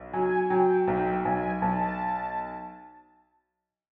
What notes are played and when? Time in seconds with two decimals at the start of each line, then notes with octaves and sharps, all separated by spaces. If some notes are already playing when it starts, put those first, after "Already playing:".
Already playing: B1
0.13 F#3 G#5
0.50 F#3 G5
0.88 B1 G5
1.25 B1 G#5
1.62 B1 A5